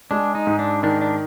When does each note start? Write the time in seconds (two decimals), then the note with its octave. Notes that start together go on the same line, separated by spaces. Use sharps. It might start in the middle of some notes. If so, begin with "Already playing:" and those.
0.11 G#3 D4
0.35 D#4
0.47 G#2
0.59 D4
0.83 D#3 D4
1.01 D4